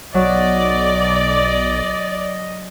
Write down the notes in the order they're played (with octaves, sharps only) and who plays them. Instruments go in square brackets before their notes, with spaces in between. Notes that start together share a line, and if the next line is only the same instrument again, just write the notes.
[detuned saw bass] B1 [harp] F#3 [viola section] D5 [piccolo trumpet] D#5